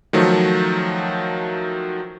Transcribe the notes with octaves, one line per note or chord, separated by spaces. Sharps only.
D#3 F3 F#3 A3